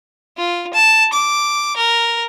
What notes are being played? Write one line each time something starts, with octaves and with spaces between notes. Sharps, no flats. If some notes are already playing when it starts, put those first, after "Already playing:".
F4
A5
D6
A#4